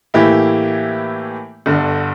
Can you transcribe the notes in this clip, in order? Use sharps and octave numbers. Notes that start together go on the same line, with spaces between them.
A2 E3 A#3 E4 G4
G1 G2 D3